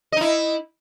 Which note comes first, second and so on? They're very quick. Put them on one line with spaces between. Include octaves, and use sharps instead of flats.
D#5 D#4 E4